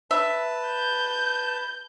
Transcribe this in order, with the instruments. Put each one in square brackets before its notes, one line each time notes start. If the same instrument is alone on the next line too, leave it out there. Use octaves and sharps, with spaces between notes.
[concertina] B4 A5 [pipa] E5
[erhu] G6